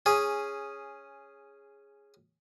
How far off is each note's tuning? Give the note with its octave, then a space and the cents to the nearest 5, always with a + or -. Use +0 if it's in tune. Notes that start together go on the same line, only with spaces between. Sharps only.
C#4 +0 G#4 -5